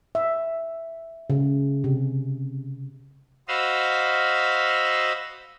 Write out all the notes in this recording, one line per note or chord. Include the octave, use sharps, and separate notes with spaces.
E5
C#3
C3
F#4 C5 D#5 F5 B5 E6